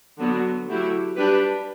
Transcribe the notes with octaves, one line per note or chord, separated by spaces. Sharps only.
D3 F#3 B3 F#4
F#3 A3 E4 G4
G3 D4 G4 B4